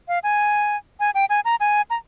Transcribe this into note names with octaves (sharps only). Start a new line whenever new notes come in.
F5
G#5
G#5
G5
G#5
A#5
G#5
A#5